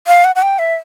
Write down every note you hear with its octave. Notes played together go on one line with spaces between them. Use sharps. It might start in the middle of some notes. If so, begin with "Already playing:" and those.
F5
F#5
F#5
G5
E5